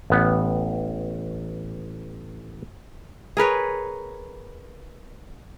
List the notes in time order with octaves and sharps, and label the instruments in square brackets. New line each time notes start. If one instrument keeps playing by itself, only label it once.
[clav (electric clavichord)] A1 B3
[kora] G#4 A#4 B4 C#5